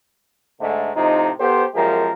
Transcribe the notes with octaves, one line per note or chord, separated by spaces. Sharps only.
G#2 D3 A3
A2 C3 F3 D#4
B3 G4 A4 C5
F#2 F3 G#3 A#3 G4 A#4